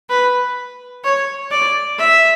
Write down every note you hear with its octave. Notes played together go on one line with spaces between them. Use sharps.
B4
C#5
D5
E5